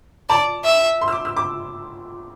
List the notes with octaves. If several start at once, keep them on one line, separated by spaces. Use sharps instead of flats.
D5 A5
E5
C6
E6
D6
E6
D6